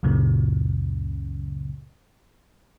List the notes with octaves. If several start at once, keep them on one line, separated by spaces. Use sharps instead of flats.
C#2 F#2 A#2 C#3